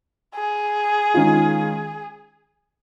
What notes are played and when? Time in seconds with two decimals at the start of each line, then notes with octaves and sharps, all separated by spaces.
0.36 G#4
1.14 D#3 G#3 C#4 F4